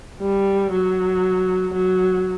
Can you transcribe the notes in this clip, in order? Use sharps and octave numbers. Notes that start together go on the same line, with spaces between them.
G3
F#3
F#3